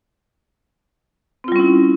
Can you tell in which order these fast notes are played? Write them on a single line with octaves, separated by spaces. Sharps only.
C4 F4 G3 C#4 E4